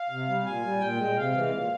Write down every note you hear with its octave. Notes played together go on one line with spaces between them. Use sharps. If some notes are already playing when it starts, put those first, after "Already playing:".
Already playing: F5
C3
G3
A#2 G#5
G3
A#2 G5
G#3
C3 F5
E3 G#3
A#2